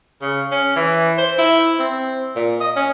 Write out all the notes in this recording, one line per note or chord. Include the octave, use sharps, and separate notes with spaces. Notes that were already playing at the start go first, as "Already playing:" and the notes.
C#3
C#4
E3
C5
E4
C4
A#2
D#5
C#4